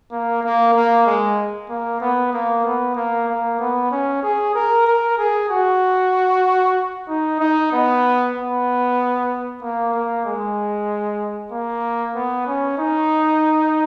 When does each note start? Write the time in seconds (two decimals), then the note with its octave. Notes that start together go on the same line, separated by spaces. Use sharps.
0.11 A#3
0.43 A#3
0.74 A#3
1.06 G#3
1.69 A#3
2.00 B3
2.33 A#3
2.65 B3
2.96 A#3
3.28 A#3
3.59 B3
3.91 C#4
4.22 G#4
4.54 A#4
4.86 A#4
5.18 G#4
5.49 F#4
7.08 D#4
7.40 D#4
7.72 B3
8.34 B3
9.61 A#3
9.94 A#3
10.25 G#3
11.51 A#3
12.14 B3
12.47 C#4
12.78 D#4